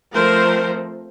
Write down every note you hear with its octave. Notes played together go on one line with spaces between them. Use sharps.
F3 A3 C4 A#4 C5